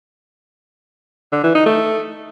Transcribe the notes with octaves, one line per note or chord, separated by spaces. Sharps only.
D3
E3
D#4
A3